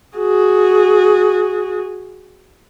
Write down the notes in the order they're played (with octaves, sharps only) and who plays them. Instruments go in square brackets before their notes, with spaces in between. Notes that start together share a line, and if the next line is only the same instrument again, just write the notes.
[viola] F#4 G#4